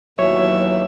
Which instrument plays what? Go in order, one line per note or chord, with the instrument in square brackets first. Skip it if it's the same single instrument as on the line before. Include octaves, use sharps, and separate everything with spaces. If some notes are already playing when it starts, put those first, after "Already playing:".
[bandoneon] D#2 B2 E3 [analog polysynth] F#3 [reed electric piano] C#5 [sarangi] E5